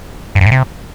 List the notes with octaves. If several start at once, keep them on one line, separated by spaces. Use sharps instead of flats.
G2
F#2
A2
C3